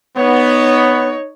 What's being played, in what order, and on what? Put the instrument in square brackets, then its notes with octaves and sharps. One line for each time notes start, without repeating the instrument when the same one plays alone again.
[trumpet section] B3 [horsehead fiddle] D#4 C#5